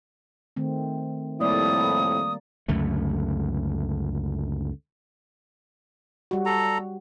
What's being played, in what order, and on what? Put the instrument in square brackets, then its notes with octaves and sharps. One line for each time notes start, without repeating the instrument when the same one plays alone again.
[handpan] D#3 A3 C4
[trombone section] F2 A2 E4 [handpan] G3 A#3 D5 [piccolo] D#6
[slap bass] C#2 F#2 D3 A3
[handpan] G3 F#4
[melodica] A4 A#5